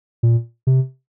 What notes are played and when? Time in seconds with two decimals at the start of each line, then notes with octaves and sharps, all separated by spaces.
0.23 A#2
0.67 C3